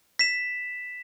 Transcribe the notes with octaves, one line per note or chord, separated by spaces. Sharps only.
B6 E7